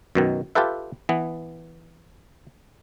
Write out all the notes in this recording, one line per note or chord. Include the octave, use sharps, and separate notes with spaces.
F#2 B2 D#3
F4 G4 A4 B4 E5
E3 B3